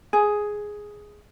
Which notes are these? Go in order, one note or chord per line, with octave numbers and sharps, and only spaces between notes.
G#4